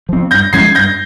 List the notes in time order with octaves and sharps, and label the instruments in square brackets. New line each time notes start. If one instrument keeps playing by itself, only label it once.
[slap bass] F3 C4
[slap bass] G2 [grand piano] G6 A#6
[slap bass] F3 G#3 C#4 [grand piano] G#6 C7
[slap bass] G2 [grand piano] G6 A#6